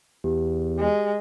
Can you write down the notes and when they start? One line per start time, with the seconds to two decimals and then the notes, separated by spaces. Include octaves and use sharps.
0.24 E2 G4
0.79 G#3